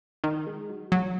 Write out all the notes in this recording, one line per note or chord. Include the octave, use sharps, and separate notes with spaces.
D#3
G#3
F#3
F#3